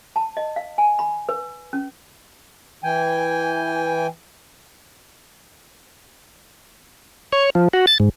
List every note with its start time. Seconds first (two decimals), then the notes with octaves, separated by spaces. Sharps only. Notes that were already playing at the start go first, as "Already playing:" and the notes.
0.16 A5
0.37 D#5
0.56 F5
0.78 G#5
0.99 B5
1.29 B4
1.73 C#4
2.83 E3 G5 G#5
7.33 C#5
7.55 F3
7.73 F#4
7.87 A6
8.00 G#2